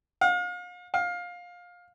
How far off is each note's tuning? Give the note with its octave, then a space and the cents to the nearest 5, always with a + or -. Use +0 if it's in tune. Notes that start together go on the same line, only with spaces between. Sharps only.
F5 +40
F5 +20